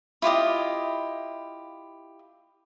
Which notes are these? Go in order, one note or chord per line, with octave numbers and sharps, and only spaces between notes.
E4 F4 G4 D#5